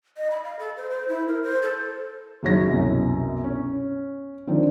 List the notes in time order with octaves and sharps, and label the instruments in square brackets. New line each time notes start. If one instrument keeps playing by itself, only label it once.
[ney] D#5
B5
F5
A4
C5
C5
E4
A#4
C5
A4
[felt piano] F#1 D#3 F#3 C#5 A#6
C2 F#2 B2
C#4
D3 D#3 F3 C4 D4